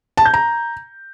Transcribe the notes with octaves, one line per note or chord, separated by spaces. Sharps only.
A5
G6
A#5